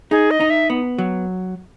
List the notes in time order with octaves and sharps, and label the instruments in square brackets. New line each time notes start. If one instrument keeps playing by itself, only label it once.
[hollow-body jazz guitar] D#4 [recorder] G#4
[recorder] D#5
[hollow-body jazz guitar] D#4
[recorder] E5
[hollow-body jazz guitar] B3
F#3